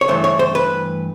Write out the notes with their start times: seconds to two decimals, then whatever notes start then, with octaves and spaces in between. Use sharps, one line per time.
0.01 C#5
0.08 G2 E3 A3 C5
0.24 C#5
0.39 C5
0.55 B4